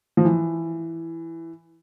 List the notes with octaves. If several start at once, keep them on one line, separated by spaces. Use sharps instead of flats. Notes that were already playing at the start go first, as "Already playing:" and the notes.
F3
E3